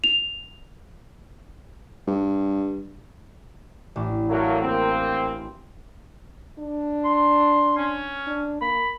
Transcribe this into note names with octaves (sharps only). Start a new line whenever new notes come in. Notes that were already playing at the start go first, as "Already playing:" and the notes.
F7
G2
A1 D4
F#3 A3 A#3
A#3 C4
D4
C6
C#4
D4
A#3 B5